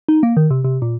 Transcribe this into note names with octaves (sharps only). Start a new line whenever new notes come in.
D#4
A#3
D#3
C3
C3
A#2